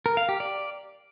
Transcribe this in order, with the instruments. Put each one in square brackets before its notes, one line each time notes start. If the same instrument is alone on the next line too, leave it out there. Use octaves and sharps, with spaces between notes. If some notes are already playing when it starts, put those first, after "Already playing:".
[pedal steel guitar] A#4
F5
G4
D5